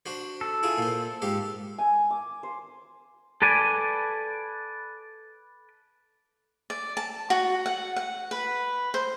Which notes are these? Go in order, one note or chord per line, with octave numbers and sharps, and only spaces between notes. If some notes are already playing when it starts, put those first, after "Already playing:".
D4 F#4 C5
A4
E4 F4 G#4
A#2 C5
G#2 G4 F5
G#5
D6
C5
A4 B4 D5 G#5
D5
A5
F#4
F#5
F#5
B4
C5